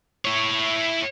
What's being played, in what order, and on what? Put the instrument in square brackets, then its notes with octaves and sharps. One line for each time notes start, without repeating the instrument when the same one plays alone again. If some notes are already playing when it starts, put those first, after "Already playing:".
[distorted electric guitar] E4 C#5